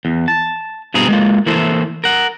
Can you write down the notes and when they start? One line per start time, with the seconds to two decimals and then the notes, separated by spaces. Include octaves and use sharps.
0.05 E2
0.28 A5
0.94 G2 B2 C4 G#4 A#5
1.08 G#3 A#3 F4
1.46 E3 A#3 E4 A4 C5
2.04 A#4 F#5